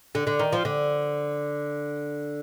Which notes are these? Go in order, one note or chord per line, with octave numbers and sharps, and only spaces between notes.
D3
D3
D#3
F3
D3